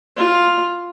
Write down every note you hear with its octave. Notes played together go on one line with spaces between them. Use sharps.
F4